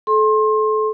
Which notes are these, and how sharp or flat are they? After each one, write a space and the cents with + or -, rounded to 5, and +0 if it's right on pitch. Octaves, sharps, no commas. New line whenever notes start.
A4 -30 C6 +30